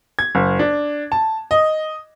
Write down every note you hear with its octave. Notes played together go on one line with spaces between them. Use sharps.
G#6
F#1
D4
A5
D#5